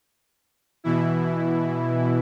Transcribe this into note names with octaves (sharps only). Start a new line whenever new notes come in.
B2 E3 E4